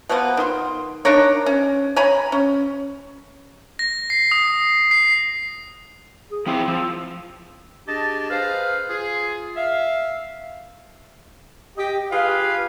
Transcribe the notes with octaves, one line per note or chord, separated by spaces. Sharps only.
B2 F3 A#3 B3
D#3 C6
D4 D#4 A#4 C#5
C#4
C#5 G#5 A#5 B5
C#4
A#6
C7
D#6
C7
G#4
F3 C4 E4 C5
F3 E6
D4 G4 G#4 D#5 A5
G#4 B4 C5 F5
F4 G#4
E5 F5
G4 D#5
F4 G4 G#4 B4 F5